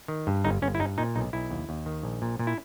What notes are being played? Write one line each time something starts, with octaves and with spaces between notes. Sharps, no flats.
D#3
G2
G1 D#4
G1 C#4
E4
G2 D#4
A#2 D#4
B1 D#4
B1 E4
D#2
D#2
D#3
A#1
A#2
A#2
E4